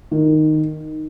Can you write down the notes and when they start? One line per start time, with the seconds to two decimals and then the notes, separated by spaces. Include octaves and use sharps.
0.11 D#3